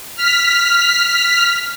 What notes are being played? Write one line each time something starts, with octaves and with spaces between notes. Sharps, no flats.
F6 B6